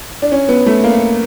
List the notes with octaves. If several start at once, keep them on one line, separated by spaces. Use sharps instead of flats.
D4
C#4
B3
A3
A#3